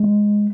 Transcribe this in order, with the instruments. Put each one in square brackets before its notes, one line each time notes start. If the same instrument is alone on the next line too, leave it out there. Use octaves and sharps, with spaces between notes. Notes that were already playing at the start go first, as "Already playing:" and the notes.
Already playing: [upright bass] G#3